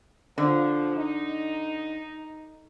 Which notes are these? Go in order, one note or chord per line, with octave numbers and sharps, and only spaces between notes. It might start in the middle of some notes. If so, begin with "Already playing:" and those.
D3 F3
D#4